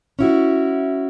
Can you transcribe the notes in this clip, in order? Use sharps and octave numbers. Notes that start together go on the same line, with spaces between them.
C#4 E4 F#4